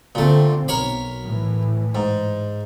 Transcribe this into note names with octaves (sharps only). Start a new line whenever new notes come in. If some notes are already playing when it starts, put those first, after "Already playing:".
A#2 D3 A3 C4
B1 A#4 C#5 B5
A2 E3
G#2